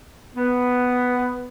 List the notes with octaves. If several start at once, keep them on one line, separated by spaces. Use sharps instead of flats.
B3